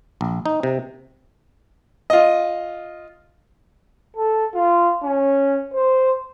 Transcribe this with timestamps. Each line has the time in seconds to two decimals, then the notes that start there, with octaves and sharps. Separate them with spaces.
0.21 A#1
0.46 D#4
0.63 C3
2.10 F4 D#5
4.17 A4
4.54 F4
5.03 C#4
5.73 C5